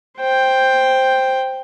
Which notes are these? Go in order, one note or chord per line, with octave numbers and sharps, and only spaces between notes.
C5 G5